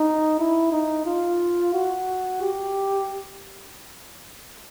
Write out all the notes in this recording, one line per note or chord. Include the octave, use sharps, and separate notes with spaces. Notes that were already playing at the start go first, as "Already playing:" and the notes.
Already playing: D#4
E4
D#4
F4
F#4
G4